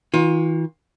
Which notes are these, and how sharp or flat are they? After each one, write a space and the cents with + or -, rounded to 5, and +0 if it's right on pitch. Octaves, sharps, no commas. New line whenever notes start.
E3 -40 F4 +30